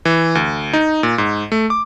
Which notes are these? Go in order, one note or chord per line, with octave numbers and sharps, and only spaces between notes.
E3
D2
D#4
A#2
G#2
A3
D6